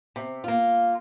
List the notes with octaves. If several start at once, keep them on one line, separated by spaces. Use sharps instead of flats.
C3
A#3 F4